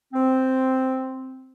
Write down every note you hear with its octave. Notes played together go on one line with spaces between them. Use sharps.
C4